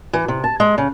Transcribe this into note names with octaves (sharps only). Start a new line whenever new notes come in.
E3
C3
A5
G#3
C#3